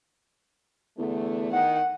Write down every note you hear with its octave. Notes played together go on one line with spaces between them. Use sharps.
E2 D3 A3
D#3 F#5